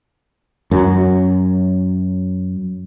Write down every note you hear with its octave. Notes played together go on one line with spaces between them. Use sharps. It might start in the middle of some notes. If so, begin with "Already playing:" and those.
F#2 F#3